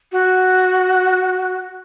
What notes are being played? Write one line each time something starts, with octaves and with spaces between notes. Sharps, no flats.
F#4